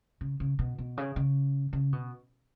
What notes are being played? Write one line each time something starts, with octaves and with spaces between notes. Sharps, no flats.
C#3
C#3
B2
B2
C#3
C#3
C#3
B2